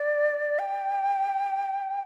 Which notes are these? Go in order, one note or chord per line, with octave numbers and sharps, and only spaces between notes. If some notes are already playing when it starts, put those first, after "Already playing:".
Already playing: D5
G5